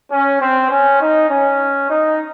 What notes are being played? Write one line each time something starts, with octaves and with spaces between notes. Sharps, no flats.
C#4
C4
C#4
D#4
C#4
D#4